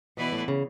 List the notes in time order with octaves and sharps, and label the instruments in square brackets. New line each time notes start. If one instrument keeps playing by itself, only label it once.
[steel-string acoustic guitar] B2 [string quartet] E3 B3 E4 B4 D5
[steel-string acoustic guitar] A2
C#3